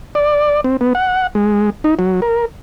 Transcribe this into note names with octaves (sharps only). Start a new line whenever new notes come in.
D5
C4
B3
F#5
G#3
D#4
F#3
A#4